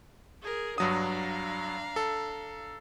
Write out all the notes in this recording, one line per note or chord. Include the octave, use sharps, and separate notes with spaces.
G#4 A#4
G2 F#3 D4 F5 A#5 D#6
A4